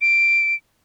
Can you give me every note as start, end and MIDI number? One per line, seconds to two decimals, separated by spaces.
0.02 0.55 98